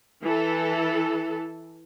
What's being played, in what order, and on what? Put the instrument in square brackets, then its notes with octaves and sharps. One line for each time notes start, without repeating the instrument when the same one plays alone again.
[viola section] E3 A4